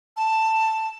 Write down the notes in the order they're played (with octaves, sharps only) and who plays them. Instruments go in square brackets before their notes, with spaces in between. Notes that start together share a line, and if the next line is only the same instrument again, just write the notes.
[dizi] A5